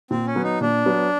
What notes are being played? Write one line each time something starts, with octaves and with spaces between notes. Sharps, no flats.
A#2 C4
C#4
F#3 B3
D#4
A#2 D4
F#3 B3